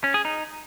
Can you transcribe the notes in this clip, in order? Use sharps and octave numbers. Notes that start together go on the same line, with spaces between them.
C#4
G#4
D#4